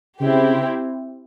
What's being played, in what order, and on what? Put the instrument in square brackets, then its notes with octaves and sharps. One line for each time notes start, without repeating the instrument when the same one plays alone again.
[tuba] C#3 [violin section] C4 E4 G4